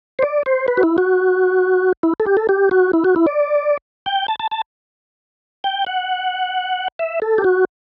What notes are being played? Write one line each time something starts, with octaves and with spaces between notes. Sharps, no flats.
C5
D5
C5
B4
F#4
E4
F#4
E4
A4
G4
A4
G4
F#4
E4
F#4
E4
D5
G5
A5
A5
A5
G5
F#5
E5
A4
G4
F#4